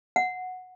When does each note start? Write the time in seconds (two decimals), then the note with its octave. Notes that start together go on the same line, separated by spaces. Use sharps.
0.16 F#5